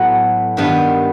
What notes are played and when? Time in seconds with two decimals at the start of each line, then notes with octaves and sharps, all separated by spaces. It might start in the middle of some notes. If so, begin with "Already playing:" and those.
Already playing: A2 F#3 B3 F#5
0.57 G2 D#3 G3 B3